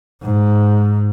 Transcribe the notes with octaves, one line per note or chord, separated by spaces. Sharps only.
G#2